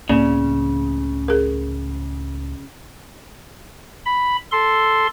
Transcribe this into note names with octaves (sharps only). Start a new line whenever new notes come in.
C#2 A2 C#3 A#3 C4 D5
G#4 A#4
B5
A4 C6